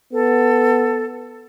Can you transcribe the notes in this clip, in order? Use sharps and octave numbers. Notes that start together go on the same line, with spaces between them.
B3 A4